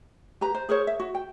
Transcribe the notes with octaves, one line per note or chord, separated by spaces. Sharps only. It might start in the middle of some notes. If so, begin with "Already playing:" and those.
G4 B4 A#5
C5
G#4 A#4 C5 C#5
E5
F#4
G5